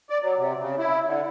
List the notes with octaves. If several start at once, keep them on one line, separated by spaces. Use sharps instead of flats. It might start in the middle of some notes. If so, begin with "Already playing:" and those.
D5
F#3
C3
C#3
E4
D3